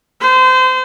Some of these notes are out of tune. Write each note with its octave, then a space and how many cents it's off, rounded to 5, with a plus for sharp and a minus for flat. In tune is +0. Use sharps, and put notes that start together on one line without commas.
C5 -30